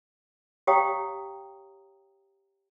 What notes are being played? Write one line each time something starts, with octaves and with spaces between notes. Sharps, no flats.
G4 C#5 F5 G5 A#5 D#6